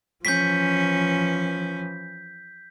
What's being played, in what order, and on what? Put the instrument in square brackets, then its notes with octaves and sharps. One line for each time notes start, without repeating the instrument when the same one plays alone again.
[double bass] E3 F3 [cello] C#4 [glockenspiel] G6 B6